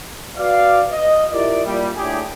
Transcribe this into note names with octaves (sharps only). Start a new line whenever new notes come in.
F#4 B4 D5 F5
D#5
E4 F4 G4 A#4 D5
A#2 G3
A2 D4 G4 G#4